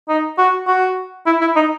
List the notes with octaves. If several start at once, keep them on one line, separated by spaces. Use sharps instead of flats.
D#4
F#4
F#4
E4
E4
D#4